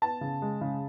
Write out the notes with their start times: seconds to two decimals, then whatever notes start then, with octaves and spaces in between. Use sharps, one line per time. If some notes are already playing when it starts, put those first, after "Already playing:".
0.02 B3 A5
0.21 C#3
0.42 G#3
0.61 C#3